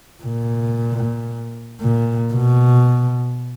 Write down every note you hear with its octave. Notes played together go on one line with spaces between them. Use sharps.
A#2
A#2
B2